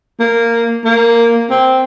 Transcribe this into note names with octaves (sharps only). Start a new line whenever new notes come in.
A#3
A#3
C4